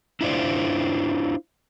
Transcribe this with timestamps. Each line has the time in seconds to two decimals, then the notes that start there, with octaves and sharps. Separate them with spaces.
0.21 D4 E4 F4 C5 D5